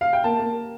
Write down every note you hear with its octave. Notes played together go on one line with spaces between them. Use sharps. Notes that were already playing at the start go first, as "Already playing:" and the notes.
F5
G5
A#3 A5
A#3